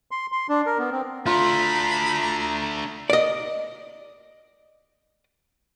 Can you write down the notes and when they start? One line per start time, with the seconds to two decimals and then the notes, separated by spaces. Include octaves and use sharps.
0.11 C6
0.32 C6
0.49 D4
0.66 A#4
0.78 B3
0.92 C4
1.26 A3 D4 F4 A#5 B5
3.10 D5 D#5